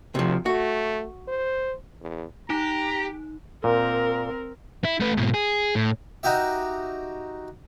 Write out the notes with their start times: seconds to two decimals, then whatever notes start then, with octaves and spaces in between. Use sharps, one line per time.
0.15 D2 C3 F3
0.46 A3 F#4
1.28 C5
2.01 E2
2.50 D#4 G4 A#5
3.64 A#2 C4 A#4
4.85 E4
5.00 A3 B4
5.17 G#2 B2
5.34 G#4
5.75 A2
6.23 D#4 F#4 G4 E5